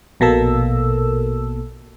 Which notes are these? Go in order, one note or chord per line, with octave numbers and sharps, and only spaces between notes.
A#1 B2 A#3 A4 E6